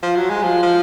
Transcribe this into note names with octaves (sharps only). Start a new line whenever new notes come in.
F3
F#3
G#3
F3
F3